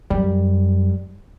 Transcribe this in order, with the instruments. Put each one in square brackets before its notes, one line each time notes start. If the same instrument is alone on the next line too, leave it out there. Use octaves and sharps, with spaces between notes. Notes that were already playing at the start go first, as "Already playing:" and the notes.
[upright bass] F#2 [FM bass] G3